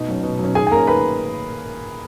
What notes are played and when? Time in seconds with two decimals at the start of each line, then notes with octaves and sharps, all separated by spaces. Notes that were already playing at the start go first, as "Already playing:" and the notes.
Already playing: B2 D#4
0.08 F#3 C#4
0.23 B2
0.39 F#3 C#4
0.55 D#3 G#4 G#5
0.67 G#5
0.71 A#3 C#4 A#4 A#5
0.87 D#3 B4 B5